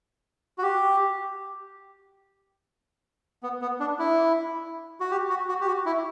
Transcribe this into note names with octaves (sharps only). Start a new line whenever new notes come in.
F#4
G4
B3
B3
D4
E4
F#4
G4
F#4
F#4
G4
F#4
E4